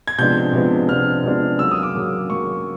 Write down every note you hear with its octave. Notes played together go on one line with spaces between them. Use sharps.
G#6
C3 F3 G#3 B3 D4 G6
C3 F3 G#3 B3 D4
C3 F3 G#3 B3 D4 F6
C3 F3 G#3 B3 D4
C#3 F#3 A#3 E6
D#6
D6
C#3 F#3 A#3
C#3 F#3 A#3 C#6